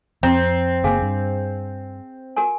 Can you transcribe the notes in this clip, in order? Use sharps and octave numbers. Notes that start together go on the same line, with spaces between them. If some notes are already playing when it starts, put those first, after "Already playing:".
F2 C4 A#5
F#1 C#3 A#3 G#4 F5 G#5
G2
F#4 A#4 G#5